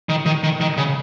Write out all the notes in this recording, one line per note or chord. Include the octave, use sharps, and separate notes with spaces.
D#3
D#3
D#3
D#3
C#3